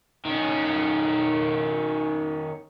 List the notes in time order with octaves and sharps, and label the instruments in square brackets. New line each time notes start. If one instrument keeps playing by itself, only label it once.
[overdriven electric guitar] D#3 C#4